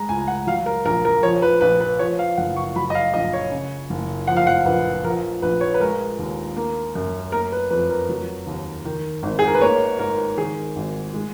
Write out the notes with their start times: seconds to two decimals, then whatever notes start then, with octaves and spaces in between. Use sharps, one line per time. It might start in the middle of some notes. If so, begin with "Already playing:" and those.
Already playing: G#3 A#5
0.09 C#2 G#5
0.28 F#5
0.47 F#3 F5
0.66 A#4
0.85 A#1 A#4
1.05 A#4
1.23 F3 C#5
1.42 B4
1.61 A#1 B4
1.81 B4
1.99 F3 C#5
2.19 F5
2.37 F#1 F#5
2.56 C#6
2.76 F#3 B5
2.90 D#5
2.95 F5
3.14 A#1 D#5
3.33 C#5
3.51 C#3
3.90 F#1
4.27 F3 F#5
4.37 F5
4.47 F#5
4.66 A#1 B4
5.04 F3 A#4
5.42 A#1 B4
5.61 C#5
5.74 B4
5.80 G#3 A#4
6.19 D#2
6.56 A#3
6.95 F#2
7.32 A#3 A#4
7.52 B4
7.70 F2 B4
7.90 A#4
8.09 F#3
8.47 D#2
8.85 D#3
9.23 G#1
9.39 G#4
9.47 A#4
9.54 B4
9.61 A#3 C#5
9.99 G#2 A#4
10.37 D#3 G#4
10.76 G#1
11.14 G#3